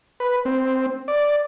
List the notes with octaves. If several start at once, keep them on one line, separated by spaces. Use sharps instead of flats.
B4
C4
D5